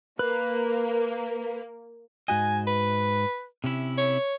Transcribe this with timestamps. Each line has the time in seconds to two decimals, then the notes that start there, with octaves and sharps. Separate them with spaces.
0.19 A#3 B4
2.28 G#2 F#4 D#5 G#5
2.67 B4
3.64 C3 C#4 E4
3.97 C#5